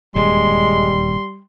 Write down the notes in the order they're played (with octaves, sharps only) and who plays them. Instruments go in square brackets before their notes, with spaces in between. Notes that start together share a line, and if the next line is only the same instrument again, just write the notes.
[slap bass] D#1 E2 G2 [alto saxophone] G3 [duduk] G#3 [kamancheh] C6